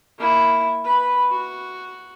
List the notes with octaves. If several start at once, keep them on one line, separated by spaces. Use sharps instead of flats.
A#3 E4
B4 B5
F#4